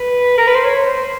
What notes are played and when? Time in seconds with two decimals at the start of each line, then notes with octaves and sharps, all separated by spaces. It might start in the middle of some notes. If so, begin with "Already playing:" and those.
Already playing: B4
0.38 A#4
0.47 B4
0.55 C5
0.64 C#5
0.86 C5